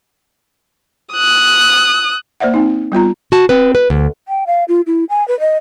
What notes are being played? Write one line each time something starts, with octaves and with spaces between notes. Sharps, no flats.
D#6 F#6
A#3 C5 D5 E5 F#5
C4 D#4
G3 B3 F4 A#5
F#4 A5
C4 B4
B4
D2
G5
F5
F4
E4
G#5
B4
D#5